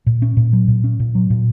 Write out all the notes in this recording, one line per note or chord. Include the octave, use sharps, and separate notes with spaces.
A#2
C#4
A#2
F#3
A#2
C#4
A#2
F#3
A#2